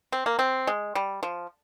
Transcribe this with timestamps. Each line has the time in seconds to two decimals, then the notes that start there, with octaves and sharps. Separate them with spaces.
0.12 C4
0.26 A#3
0.39 C4
0.67 G#3
0.95 G3
1.23 F3